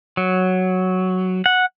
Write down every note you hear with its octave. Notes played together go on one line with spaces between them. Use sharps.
F#3
F#5